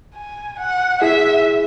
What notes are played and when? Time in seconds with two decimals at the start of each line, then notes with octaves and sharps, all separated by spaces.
0.15 G#5
0.59 F#5
1.02 E4 G#4 E5